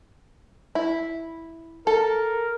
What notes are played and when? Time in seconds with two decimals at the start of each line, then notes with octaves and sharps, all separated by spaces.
0.75 E4
1.87 A4 A#4